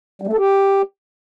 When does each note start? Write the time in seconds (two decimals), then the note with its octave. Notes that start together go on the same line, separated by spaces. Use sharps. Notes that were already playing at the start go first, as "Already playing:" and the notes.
0.22 G3
0.27 A3
0.33 A4
0.39 G4